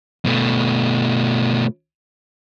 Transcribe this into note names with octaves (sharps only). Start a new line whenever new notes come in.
B2 A3